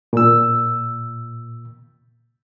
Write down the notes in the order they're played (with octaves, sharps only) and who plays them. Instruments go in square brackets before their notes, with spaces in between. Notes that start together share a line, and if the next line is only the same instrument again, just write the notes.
[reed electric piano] A#2 E6